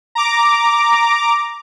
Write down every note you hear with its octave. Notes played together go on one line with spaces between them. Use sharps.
A#5 D6